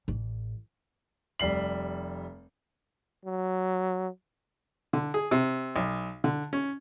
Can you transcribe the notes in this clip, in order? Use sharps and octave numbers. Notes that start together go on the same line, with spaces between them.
A1
F1 G3 C7 F#7
F#3
D3
G#4
C3
B1
D3
C#4